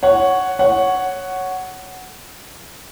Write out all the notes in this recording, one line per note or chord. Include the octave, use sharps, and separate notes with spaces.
C#5 F#5
C#5 F#5